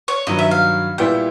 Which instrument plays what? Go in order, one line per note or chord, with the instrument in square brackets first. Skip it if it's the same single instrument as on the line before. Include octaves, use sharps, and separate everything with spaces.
[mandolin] C#5
[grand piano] G2 D#3 F#3 [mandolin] D#5
[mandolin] E5
F5
[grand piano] A#2 G3 B3 E4 [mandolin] G5